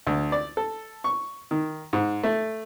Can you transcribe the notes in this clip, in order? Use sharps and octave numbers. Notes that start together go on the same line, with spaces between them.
D2
D5
A4
C#6
D#3
G#2
A3